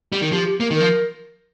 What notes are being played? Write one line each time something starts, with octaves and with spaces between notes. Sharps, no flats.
G3
D#3
F3 G4
G4
A#3
D#3
F3 A#4